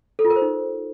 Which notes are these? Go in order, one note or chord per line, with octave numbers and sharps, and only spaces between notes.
A4
F4
A#4
C5
D#4